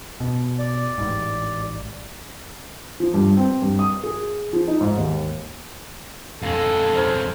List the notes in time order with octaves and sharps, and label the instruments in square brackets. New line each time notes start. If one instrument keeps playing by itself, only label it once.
[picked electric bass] B2
[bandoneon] D5
[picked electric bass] A1 G#2
[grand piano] F3
G2
C4
G2
D#6
G#4
F3
D#4
G#2
D#2
[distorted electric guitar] F2 G#3 [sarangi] A4 [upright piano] F5
[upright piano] C5 F6 G#6